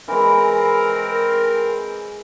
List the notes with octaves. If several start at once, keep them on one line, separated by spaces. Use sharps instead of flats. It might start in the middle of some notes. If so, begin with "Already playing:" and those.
E3 G#3 C4 A#4